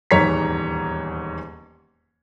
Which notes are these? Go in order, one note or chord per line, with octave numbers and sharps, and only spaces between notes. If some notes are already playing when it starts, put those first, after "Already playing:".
D#1 E2 G#2 C#5 A#5 B6